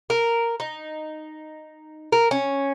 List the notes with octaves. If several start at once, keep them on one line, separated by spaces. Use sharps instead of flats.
A#4
D#4
A#4
C#4